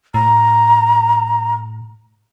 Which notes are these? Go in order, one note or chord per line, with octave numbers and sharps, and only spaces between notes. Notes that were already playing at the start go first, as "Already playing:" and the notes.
A2 A#5